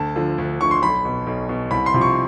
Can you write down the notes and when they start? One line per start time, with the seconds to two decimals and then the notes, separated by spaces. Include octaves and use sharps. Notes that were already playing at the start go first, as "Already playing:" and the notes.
Already playing: D2 A5
0.16 D3 F3
0.38 D2
0.60 D3 F3 C#6
0.71 C6
0.82 B1 B5
1.05 B2
1.27 B1
1.49 B2
1.71 C2 B5
1.86 C6
1.94 C3 F3
2.01 C#6